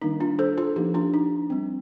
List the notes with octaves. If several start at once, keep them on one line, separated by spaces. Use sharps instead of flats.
D#3 G3 A#3 D4 D#4
D4 F4
A4 C5
F4 A4
F3 A#3 D4 D#4 G4
D4 F4
D#4
G3 C4